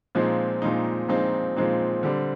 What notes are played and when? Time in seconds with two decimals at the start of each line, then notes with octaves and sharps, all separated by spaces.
0.15 A#2 F3 G#3 C4 D#4
0.62 A#2 F3 G#3 C4 D#4
1.08 A#2 F3 G#3 C4 D#4
1.56 A#2 F3 G#3 C4 D#4
2.03 D3 G3 C4